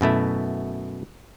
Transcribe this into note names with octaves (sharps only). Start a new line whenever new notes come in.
F#2 B2 A3 E4